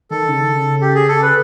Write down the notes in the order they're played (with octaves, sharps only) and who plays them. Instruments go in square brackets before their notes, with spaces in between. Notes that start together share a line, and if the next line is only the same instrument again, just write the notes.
[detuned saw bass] D#3 [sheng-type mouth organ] A4
[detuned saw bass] C#3
[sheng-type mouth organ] G4
G#4
A4
B4